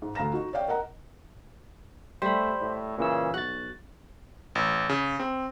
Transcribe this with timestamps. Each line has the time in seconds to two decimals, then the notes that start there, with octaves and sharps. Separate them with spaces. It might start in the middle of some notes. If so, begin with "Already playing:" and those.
0.02 G#2
0.15 D2 F5 A#5 A#6 E7
0.33 D#4 F#4
0.53 C#5 D5 F5 G5
0.68 A#4 D#5 F#5 A#5
2.22 G3 A3 C5 B5
2.61 A2
2.98 A#2 C#3 E3 E6
3.34 B1 F#4 F#6 A6
4.55 A1
4.89 C#3
5.20 C4